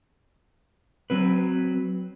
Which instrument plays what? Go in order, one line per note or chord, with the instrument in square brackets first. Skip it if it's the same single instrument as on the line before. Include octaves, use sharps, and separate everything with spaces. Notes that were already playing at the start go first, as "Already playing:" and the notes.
[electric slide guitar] F#3 C4 B4